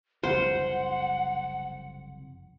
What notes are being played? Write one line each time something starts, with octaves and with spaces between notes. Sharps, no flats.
F#1 C2 F2 C5 F#5